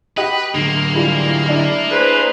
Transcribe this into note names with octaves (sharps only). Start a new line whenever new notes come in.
F#4 G4 B4 D#5
D3 F#3 G#3 A#3 C7
E3 G3 F4
D4 E4
G#4 B4 C5